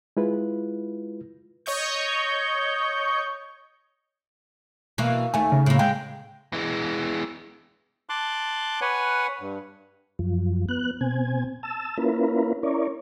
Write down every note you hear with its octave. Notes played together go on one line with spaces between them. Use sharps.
G#3 E4 F4 B4
C#5 D#5 C#6 G6
B2 E3 A#3
D#2 A3 G#5
C#3
A2 A#3
G#3 G5
E3 G#3
A5 C6 D6 F#6
B4 C#5 F#5 G#5
G2
F#2 F3
B3 F#6
B2 C4 G#5
A5 E6
A#3 C#4 E4 F4 A#4 B4
C#4 E4 A#4 C#5 D5